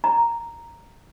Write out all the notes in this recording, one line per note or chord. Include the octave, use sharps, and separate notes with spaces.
A#5